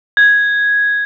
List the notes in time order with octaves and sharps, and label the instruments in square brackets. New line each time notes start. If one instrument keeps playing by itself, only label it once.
[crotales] G#6